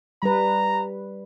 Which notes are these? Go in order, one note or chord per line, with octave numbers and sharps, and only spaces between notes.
G3 B4 A#5